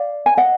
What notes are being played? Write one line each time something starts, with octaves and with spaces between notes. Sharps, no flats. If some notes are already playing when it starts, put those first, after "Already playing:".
Already playing: D5 F5
G#5
D#5 F#5